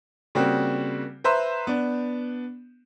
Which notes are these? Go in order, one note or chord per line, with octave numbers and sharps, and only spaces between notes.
C#3 G3 A#3 C4 F#4
B4 C5 E5 A#5 C6
B3 D4